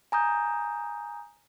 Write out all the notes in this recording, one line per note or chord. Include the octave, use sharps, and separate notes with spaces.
G#5 A#5 D#6 G6